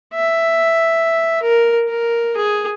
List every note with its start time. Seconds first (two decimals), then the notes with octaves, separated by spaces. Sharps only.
0.14 E5
1.43 A#4
1.88 A#4
2.36 G#4